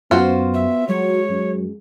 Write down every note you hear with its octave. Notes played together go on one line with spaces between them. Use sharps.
F#2 B3 F4 F#4 C5
E5
F#3 G#3 C#5
F#2